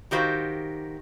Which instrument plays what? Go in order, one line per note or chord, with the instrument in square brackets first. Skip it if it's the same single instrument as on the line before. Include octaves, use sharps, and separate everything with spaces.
[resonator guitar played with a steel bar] D#3 F#4 G4 C5 F5